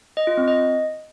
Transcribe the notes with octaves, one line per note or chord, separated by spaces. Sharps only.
D#5
F4
C4
D#5